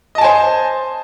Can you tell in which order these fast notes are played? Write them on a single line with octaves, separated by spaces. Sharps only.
D#5 A5 G#5 C5